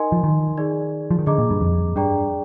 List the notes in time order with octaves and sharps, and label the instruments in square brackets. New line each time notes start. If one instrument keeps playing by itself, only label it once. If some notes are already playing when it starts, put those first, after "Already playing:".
Already playing: [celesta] D#4 A#4 D#5 G#5 C6
[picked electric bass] F3
D#3
[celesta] D#4 G#4 D5
[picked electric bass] F3
D#3
[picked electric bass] D3 [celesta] G#4 D#5 A#5 D6
[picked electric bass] A#2
G2
F2
[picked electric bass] G2 [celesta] D4 G#4 D5 G5 A#5